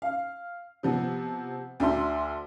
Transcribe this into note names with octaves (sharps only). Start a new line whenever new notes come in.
F5
C3 F3 B3
D2 D4 E5 C6